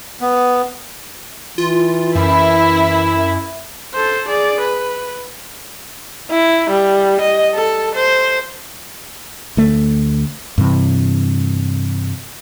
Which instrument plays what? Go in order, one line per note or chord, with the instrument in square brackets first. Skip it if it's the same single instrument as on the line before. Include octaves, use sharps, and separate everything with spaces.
[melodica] B3
[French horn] E3 [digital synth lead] F4
[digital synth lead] F#2 [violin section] E4
[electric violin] A4 C5
G#4 D5
B4
[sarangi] E4
G3
D#5
A4
C5
[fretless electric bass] D2 A3
G2 C3 E3